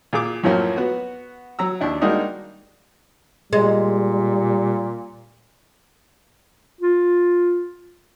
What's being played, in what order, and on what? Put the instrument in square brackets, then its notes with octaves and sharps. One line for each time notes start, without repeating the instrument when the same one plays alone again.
[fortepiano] A#2 G#4 D6
F#2 A2 F3 F#3 A#3 C#4
B3 F#4
F#3 A#5 E6
D#2 D4 E4
G3 G#3 A#3 D4 D#4 F#4
[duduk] A#2 [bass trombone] G3 [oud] G#3
[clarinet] F4